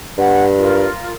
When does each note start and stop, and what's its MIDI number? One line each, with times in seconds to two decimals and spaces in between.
0.18 0.86 43
0.18 0.44 78
0.58 1.12 65
0.58 1.12 70